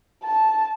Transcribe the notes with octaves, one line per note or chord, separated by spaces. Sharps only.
A5